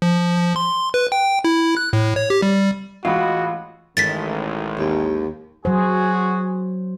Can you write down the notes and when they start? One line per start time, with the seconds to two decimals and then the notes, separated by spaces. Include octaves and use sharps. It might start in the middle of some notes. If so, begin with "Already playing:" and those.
0.02 F3
0.38 F3
0.56 C6
0.94 B4
1.12 G5
1.44 E4
1.77 F#6
1.93 A2
2.16 C#5
2.30 G4
2.42 G3
3.05 A1 G#3 F4 F#4 B5
3.97 A1 D#3 G#3 A6 B6
4.78 D#2
5.65 F#3 F#4 G#4 C5